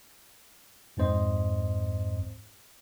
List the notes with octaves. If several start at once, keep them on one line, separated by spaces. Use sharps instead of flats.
F2 G#2 C4 C5 D#5